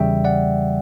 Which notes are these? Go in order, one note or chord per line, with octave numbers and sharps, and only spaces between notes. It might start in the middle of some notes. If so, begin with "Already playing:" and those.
Already playing: E2 C#3 E3 G3 E5 G5
D5 F#5